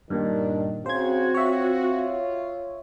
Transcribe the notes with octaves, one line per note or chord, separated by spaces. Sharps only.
G2 A#2 D#3 D4
C#3 C4 F#4 C5 G#6
F4 C#5 E5